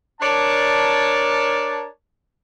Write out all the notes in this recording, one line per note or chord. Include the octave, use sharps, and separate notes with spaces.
D4 A#4 C#5 D5 A5